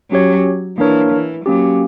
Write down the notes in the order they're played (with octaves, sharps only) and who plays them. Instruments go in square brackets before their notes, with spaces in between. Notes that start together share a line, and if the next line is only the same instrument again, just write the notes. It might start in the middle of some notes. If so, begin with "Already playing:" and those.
[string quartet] F#3 [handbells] C#4 G4 C#5
[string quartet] E3 [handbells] A#3 D4 A#4 C#5
[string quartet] E3
[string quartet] F#3 [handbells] A#3 C#4 G4